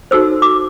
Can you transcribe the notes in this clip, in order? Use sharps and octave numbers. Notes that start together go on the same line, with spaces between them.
D#4 F#4 A4 C5 E6
D6